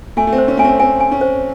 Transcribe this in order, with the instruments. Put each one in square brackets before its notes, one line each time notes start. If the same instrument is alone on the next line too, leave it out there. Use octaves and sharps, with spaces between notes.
[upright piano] A3 [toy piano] G#5
[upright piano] A3
C4
[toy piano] C5
[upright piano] C#4
[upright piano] A3 [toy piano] G#5
[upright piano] C4
[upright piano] C4 [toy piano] G#5
[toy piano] G#5
[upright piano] C#4
[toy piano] C5